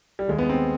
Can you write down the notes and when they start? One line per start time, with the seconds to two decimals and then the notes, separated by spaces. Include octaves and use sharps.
0.19 G3
0.28 D#2 D#3 G#3
0.38 B3
0.49 C4